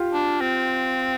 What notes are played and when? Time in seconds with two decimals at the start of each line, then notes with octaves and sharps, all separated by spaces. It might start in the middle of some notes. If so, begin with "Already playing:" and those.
Already playing: F4 G4
0.13 D4
0.41 C4